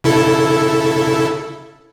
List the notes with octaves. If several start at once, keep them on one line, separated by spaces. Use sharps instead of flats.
C#3 E4 A4